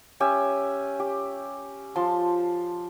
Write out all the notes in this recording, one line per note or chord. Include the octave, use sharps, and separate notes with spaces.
C#4 G4 E5 G#5
G4
F3 A5 C6